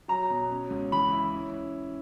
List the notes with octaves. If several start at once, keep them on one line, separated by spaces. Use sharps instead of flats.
F#3 A#5
B2
C#4
C#2
E3 B5
E4
C#4